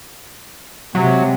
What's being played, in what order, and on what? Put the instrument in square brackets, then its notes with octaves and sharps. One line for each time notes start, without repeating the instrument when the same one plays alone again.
[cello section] C3 G#3 [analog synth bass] F#3